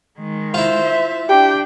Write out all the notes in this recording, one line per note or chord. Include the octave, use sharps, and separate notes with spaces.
D#3 G#3
E4 F4 C5
E5
D4 G4 G5